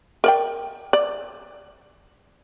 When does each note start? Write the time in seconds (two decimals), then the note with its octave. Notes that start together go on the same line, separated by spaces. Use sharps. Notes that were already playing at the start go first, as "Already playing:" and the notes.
0.24 A#4 D5 G5
0.93 D5